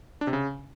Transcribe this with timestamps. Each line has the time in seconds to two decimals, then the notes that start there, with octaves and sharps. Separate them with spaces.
0.21 D4
0.27 C3
0.33 C#3